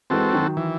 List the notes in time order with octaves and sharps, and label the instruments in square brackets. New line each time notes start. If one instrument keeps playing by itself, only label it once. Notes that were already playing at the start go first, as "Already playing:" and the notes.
[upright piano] E3 G#3 [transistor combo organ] C4 F#4 A4
[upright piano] D#3 F#3
[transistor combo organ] E3